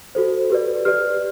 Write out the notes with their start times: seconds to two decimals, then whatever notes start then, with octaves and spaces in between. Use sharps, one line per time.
0.15 F#4 A4 C5
0.50 G4 B4 D5
0.85 G4 B4 D5 F6